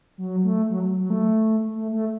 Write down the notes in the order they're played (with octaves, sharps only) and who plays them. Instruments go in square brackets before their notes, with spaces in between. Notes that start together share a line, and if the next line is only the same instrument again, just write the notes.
[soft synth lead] F#3
A3
F#3
F#3
A3
A3
A3